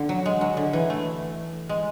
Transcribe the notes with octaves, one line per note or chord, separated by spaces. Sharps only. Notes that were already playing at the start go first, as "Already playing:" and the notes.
Already playing: D3
F#3
G#3
F#3
D3
E3
A3
G#3